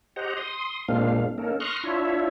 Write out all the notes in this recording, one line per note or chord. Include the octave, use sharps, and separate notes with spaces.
G4 C5 D#5 F#5 A#5
C6 D#6
A#2 G#3 A#3 C4 D4 F5
A#3 C#4 D#4 A4 A#4
A#5 C6 C#6 D#6 F6 F#6
D4 E4 F4 C#5 E5